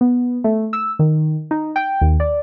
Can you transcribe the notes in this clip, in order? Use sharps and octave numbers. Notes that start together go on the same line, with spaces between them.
B3
A3
E6
D#3
D#4
G5
D#2
D5